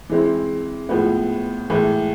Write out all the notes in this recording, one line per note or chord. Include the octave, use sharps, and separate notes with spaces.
E3 G#3 C4 E4
A2 F3 G#3 B3
A2 E3 G#3